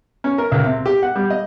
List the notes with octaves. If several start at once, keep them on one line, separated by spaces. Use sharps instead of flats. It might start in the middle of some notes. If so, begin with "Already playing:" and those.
C#4
A#4
C#2
C3
G4
F#5
G3
D#5